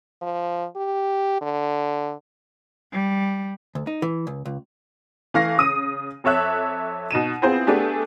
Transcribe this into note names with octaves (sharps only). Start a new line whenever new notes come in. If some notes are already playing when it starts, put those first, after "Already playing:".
F3
G4
D3
G3
D2
D#4
E3
C#2
C#2
E3 A3 F5 C#6 A#6 C7
C#3 D#6 D#7
F2 A4 C#5 E5 F#6
B2 D#4 D#7 E7
B3 C4 E4 F4 G#4 C5
A3 B3 D4 G4 G#4